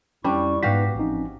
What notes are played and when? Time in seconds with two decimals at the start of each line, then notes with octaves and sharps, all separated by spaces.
0.24 F2 G3 C#4 D4 E4 C#6
0.63 G#2 B3 D#4 F#4 G4 B4 F5 B6
0.95 A1 F3 C4 C#4 D#4